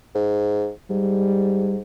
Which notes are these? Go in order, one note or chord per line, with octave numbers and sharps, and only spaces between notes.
G#2
G#2 G3